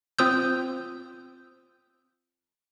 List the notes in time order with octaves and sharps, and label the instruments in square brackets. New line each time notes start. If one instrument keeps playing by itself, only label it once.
[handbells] C4 F4 C5 D#6 E6 G6